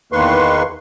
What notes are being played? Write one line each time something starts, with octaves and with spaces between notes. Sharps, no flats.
E2 D#3 A#3 B4 C6 C#6